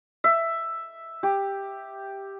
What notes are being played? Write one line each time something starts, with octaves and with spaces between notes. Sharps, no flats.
E5
G4